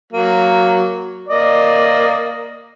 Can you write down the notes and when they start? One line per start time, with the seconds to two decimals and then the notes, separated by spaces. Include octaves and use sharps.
0.13 F#3 A#3
1.29 A#3 D5 D#5